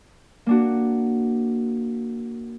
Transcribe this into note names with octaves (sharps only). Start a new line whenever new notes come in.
A#3 D4 F#4